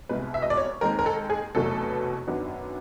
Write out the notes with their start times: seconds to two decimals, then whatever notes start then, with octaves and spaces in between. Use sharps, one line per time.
0.09 C2 B2 G#3 B4
0.34 E5
0.42 D#5
0.50 D5
0.57 C#5
0.81 D#2 D#3 G#3 C4 A#4
0.99 A#4
1.06 A4
1.30 G#4
1.55 F1 E2 B2 F#3 A3 A4
2.27 F#2 D#3 F#3 B3 D4